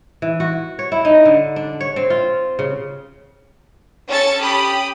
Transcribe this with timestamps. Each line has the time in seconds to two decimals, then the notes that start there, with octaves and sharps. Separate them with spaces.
0.22 E3
0.40 F#4
0.79 C#5
0.92 E4
1.05 D#4
1.25 D3
1.56 D4
1.80 C#5
1.96 C4
2.10 F4
2.59 C#3
4.08 C#4 A4 A6 C#7
4.40 G4 B5 D#6